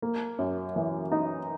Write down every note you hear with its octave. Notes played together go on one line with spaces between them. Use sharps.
A#3
F#2
E3
D#4